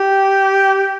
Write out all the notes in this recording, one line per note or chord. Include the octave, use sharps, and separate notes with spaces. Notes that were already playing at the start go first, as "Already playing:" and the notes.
Already playing: G4